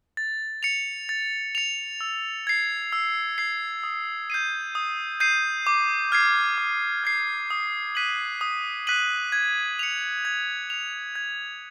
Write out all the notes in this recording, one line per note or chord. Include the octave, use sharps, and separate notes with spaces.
A6
C#7 F7
A6
C#7 F7
E6
G#6 C7
E6
G#6 C7
D#6
G6 C7 D#7
D#6
G6 C7 D#7
D6
F6 G#6 C7
D6
F6 G#6 C7
D#6
F#6 B6 D#7 F#7
D#6
F#6 B6 D#7 F#7
G#6
C#7 F7
G#6
C#7 F7
G#6